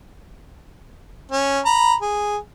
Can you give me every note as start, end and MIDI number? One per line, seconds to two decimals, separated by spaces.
1.32 1.60 61
1.65 1.95 82
1.65 1.95 83
2.02 2.37 68